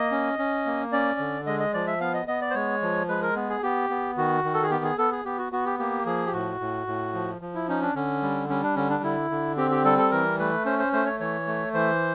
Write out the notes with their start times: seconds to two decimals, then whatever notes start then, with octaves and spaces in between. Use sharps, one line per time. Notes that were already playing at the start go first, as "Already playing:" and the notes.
Already playing: A#3 D#5
0.12 C#4
0.39 C#4
0.66 A#3
0.92 C#4 D5
1.19 D3
1.47 G#3 D#5
1.60 D#5
1.74 F3 D5
1.87 E5
2.00 B3 F5
2.14 D#5
2.28 B3 D#5
2.41 D5
2.50 C5
2.54 G#3 C#5
2.82 F3
3.08 G#3 B4
3.22 A#4
3.36 B3
3.50 G#4
3.63 B3 G4
3.90 B3
4.17 D#3 F#4
4.44 D#3
4.54 A4
4.62 G#4
4.71 B3 G4
4.84 G#4
4.98 B3 A4
5.12 G#4
5.25 B3 G4
5.38 F#4
5.52 B3 F#4
5.66 G4
5.79 A#3 G4
6.06 F3 G#4
6.26 G4
6.33 A2 F#4
6.60 A2
6.87 A2
7.14 F3
7.41 F3
7.55 E4
7.69 C#4 D#4
7.82 D4
7.95 D3 C#4
8.22 G3
8.49 G3 C#4
8.63 D4
8.76 D3 C#4
8.90 D4
9.03 D3 E4
9.30 D3
9.57 C4 G4
9.71 G4
9.84 G3 A4
9.98 A4
10.11 E3 A#4
10.39 A3 B4
10.65 C#4 C5
10.79 C5
10.93 A3 C5
11.06 C#5
11.20 E3 C#5
11.47 A3
11.74 E3 C5